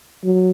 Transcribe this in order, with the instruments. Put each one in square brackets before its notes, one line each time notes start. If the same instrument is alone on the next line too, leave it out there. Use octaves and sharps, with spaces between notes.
[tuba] F#3